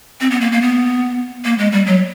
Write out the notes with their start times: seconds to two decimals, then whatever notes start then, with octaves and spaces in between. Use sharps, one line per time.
0.21 C4
0.31 B3
0.41 A#3
0.52 A#3
0.62 B3
1.45 A#3
1.58 G#3
1.72 G3
1.86 F#3